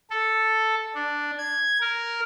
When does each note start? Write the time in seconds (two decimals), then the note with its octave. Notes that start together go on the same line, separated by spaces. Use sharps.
0.10 A4
0.95 D4
1.38 G#6
1.81 A#4